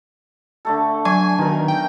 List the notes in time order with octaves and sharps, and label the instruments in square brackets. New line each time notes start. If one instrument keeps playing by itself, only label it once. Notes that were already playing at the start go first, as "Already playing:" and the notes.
[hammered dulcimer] D3 A3 A4
[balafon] F#3 C#6 [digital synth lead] G#5
[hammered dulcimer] B2 A#4 [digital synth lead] D#3
[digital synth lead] G5